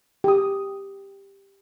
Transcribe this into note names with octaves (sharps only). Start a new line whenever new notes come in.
G4 D#6